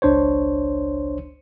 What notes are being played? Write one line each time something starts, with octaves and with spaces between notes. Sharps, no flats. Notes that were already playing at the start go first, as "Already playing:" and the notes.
G#1 C#2 D4 C5 C#5